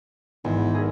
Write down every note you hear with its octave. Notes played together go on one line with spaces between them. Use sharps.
G#1 E2
E4 G#4 A#4